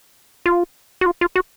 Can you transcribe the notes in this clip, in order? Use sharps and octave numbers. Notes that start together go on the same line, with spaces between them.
F4
F#4
F4
F4
F#4